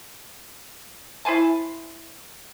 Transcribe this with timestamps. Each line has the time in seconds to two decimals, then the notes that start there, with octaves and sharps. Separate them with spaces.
1.25 E4 C5 G#5 A5